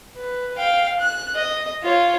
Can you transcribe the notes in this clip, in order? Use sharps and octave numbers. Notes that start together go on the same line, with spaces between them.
B4
F5 G5
F#6
D#5
F4 C#5